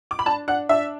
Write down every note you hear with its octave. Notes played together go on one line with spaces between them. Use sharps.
D6
B5
D4 A5
D4 F#5
D4 E5